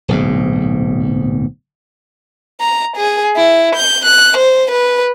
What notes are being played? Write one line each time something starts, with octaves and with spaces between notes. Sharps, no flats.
D1 B1 G#2
A#5
G#4
E4
G6
F#6
C5
B4